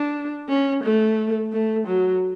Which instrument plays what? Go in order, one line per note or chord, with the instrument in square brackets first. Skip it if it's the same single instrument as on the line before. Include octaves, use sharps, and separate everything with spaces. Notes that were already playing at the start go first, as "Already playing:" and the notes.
Already playing: [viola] D4
C#4
A3
A3
F#3